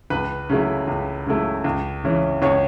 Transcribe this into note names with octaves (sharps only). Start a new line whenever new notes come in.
C#2 B4 B5
C#3 F#3 A3 E4
C#2
C#3 F#3 A3 E4
C#2
C#3 E3 C#4
C#2 C#5 C#6